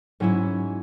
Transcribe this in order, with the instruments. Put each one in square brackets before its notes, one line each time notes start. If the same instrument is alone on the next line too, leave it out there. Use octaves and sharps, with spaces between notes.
[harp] G#2 F#3 C#4 E4